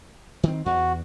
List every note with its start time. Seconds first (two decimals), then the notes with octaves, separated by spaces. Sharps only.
0.43 D#3 C4
0.66 E2 F#4